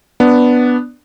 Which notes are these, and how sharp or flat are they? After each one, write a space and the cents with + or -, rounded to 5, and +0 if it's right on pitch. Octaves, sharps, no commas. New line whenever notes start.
B3 +0 D4 +0